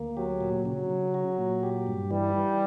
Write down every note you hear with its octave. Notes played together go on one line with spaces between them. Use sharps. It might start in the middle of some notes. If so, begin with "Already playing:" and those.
Already playing: D2 A#3
F#3 G4
A#2
C#3 F#3
C#3
F#4
A#2
G4
G2
E3 G3
E3